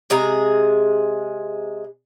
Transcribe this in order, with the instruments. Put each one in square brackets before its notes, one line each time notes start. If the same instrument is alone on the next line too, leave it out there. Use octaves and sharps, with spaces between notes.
[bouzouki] C3 G#3 G#4 A#5